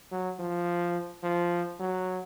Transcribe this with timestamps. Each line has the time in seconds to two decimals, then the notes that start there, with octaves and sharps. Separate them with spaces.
0.12 F#3
0.39 F3
1.23 F3
1.80 F#3